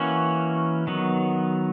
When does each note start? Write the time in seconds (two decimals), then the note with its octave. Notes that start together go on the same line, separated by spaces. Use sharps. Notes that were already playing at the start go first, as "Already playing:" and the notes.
Already playing: E3 A#3 C#4 F#4 C#5
0.87 D#3 F#3 B3